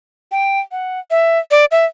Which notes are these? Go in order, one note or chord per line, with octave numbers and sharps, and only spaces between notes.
G5
F#5
E5
D5
E5